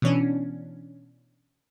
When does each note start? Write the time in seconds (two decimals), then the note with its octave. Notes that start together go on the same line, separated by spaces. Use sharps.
0.02 B2 E3 C#4 D4